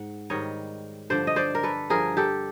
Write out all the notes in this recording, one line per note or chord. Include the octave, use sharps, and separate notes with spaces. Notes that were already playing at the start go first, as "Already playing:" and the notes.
Already playing: G#2 F#5
G#2 D#3 G3 C#5 D#5
G2 D3 F3 C5 D5
D#5
C5 D5
A#4
A4 B4
G2 D3 F3 G#4 A#4
G4 A4